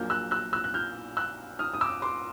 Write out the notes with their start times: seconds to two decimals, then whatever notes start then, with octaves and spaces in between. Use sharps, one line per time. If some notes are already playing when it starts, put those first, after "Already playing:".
Already playing: A#1 A#2 F#3 A#3 F6 G6
0.10 E6 F#6
0.31 E6 F#6
0.53 E6 F#6
0.64 F#6
0.74 F6 G6
1.17 E6 F#6
1.59 D#6 F6
1.74 D#6
1.81 D6 E6
2.02 C6 D6